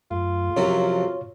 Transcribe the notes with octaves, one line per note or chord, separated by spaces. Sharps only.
F#2 A3 F4
F#2 C3 F3 F#3 A4 C#5